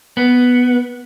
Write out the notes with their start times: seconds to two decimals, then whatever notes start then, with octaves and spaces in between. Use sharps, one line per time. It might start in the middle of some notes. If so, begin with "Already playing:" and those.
0.17 B3